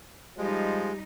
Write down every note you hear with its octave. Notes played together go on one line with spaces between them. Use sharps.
F3 G3 G#3 D#4 G4